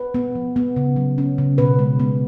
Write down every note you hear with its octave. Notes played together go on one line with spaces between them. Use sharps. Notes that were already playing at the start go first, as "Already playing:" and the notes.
Already playing: B4
B3
F3
B3
C#3
F#3
C#4
C#3
B2 B4
G#3
B3